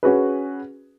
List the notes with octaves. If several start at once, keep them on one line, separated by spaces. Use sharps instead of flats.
C#4 F#4 G#4 B4